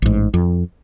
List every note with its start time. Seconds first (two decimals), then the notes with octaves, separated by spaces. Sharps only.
0.02 A1 G#2
0.34 F2